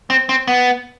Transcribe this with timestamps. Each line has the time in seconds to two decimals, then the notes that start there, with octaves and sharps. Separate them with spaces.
0.10 C4
0.29 C4
0.47 B3